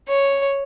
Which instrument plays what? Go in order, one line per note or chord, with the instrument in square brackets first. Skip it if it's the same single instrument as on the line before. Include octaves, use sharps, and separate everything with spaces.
[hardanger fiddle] C#5